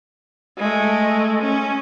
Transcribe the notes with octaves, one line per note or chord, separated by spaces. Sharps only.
G#3 A3
C#4